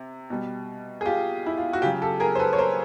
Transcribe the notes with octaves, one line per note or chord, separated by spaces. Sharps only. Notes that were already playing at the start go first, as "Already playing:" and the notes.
Already playing: C3
B2 G3
G#4
F4 G4
E4
F4
F#4
C#3 F#3 F4 G4
G4 A4
G#4 A#4
C5
A4 B4
C#5
A#4 C5